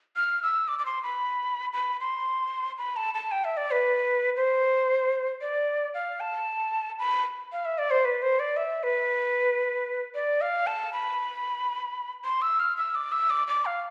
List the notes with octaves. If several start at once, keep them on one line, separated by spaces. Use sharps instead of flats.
F6
E6
D6
D6
C6
B5
B5
C6
B5
A5
A5
G5
E5
D5
B4
C5
D5
F5
A5
B5
F5
E5
D5
C5
B4
C5
D5
E5
B4
D5
F5
A5
B5
C6
E6
F6
E6
D6
E6
D6
D6
F5